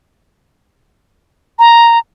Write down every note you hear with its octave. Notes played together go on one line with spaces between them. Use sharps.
A#5